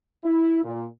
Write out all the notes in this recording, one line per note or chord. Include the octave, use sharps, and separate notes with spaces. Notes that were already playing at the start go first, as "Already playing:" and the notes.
E4
A#2